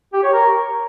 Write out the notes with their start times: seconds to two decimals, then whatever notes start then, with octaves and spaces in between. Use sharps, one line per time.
0.13 G4
0.23 C#5
0.33 A#4